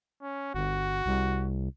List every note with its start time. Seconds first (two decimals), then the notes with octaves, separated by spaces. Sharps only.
0.22 C#4
0.55 G1 F#4
1.06 C2